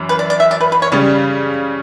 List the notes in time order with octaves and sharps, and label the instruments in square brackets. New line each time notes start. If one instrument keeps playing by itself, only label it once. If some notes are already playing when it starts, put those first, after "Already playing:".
Already playing: [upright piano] F#2 E3
[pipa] B4
D5
D5
E5
D5
B4
B4
C#5
[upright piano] C#3 G3 C#4 [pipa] D5